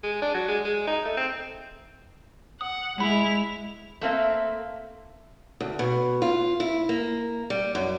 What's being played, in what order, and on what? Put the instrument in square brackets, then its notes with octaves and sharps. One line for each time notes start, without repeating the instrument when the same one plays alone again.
[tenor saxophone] G#3
D4
F#3
G#3
G#3
D#4
A3
C4
[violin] F#5 [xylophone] D#6
[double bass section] G#3 [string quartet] E4 [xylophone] B5 [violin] F7
[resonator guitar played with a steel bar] A3 A#3 C4 E5
[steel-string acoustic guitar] D2
B2
F4
E4
A#3
G3
F#2